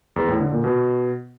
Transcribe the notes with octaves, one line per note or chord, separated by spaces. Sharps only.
E2
A2
D3
A#2
B2